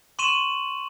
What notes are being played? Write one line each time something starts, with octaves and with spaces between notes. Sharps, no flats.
C6 C#6 D#7 E7 F#7